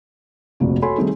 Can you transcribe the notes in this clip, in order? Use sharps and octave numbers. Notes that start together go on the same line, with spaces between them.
F1 A#1 C3 F#4
F#4 A4 C#5 G#5 B5 C6
D#3 G3 A3 C4 D#4 G#4